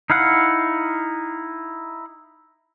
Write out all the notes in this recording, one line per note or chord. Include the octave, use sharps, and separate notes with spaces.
D#4 E4 F5 F#5